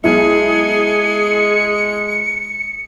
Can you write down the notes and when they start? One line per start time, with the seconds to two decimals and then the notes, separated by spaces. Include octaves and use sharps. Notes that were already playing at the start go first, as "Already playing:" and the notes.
0.04 B1 G#3 E4 G#4 C#7